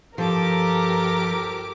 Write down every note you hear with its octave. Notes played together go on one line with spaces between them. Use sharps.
G2 F3 G4 A4 A#4 D6